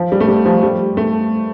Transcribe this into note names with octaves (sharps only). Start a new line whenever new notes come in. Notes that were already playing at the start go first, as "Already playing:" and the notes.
Already playing: F3
G3
A3
G3
F3
G3
A3